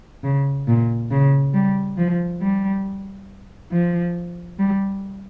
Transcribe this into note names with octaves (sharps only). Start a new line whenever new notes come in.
C#3
A#2
C#3
G3
F3
G3
F3
G3